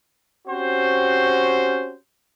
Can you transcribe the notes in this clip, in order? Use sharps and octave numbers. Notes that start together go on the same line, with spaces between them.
C4 C#4 F#4 G4 C5